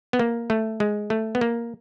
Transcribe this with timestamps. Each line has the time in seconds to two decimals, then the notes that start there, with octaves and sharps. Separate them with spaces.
0.13 B3
0.19 A#3
0.50 A3
0.80 G#3
1.10 A3
1.35 B3
1.41 A#3